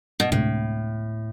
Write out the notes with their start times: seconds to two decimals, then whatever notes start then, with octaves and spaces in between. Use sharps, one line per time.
0.20 B2
0.31 D2 A2 C3 G#3 D4